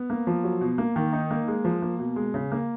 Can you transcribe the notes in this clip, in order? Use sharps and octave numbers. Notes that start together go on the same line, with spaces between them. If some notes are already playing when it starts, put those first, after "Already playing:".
Already playing: B3
A#3
F3
F#3
B2
A#3
D#3
D#4
A#3
G#3
F3
A#3
B2
G#3
C#3
A#3